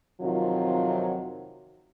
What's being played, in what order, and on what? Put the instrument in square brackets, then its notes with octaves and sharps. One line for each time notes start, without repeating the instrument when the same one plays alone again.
[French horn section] F2 C3 D#3 F#3 F4